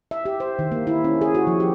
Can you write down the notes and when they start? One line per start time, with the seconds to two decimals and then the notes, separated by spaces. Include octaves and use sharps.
0.11 E5
0.25 G4
0.40 C5
0.59 D#3
0.72 A#3
0.87 E4
1.04 C#4
1.21 G#4
1.35 F#4
1.47 F3
1.60 G4